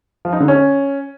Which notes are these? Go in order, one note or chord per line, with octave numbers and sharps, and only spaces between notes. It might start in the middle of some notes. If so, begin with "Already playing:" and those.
F3
D#4
D3
C#4